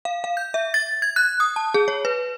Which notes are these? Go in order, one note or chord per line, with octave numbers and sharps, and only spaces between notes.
F5
F5
G6
E5
A6
G#6
F#6
D#6
A5
G#4
C#5
B4